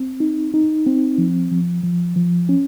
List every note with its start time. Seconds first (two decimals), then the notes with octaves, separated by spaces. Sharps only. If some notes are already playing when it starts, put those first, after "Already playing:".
Already playing: C4
0.20 D#4
0.54 D#4
0.86 C4
1.18 F3
1.51 F3
1.83 F3
2.16 F3
2.49 C#4